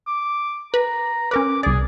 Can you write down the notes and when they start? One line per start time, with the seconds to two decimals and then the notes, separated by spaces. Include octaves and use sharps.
0.07 D6
0.74 B4 A#5
1.31 C#4 A#4 B4 D6
1.63 C2 G#4 D5